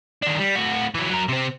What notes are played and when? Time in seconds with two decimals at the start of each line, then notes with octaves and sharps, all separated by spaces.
0.23 D#3 D4
0.39 G3
0.56 A2 F#4
0.94 E3 F#3
1.10 F#3 A#4
1.28 C3 C4